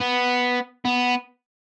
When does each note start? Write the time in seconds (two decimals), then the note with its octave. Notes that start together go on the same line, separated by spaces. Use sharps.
0.01 B3
0.85 B3